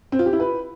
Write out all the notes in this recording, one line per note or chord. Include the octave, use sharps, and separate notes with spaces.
C4
F4
G4
E4
B4